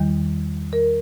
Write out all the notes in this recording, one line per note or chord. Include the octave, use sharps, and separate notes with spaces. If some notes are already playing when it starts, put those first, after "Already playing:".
Already playing: E2 D#3 G3
A#4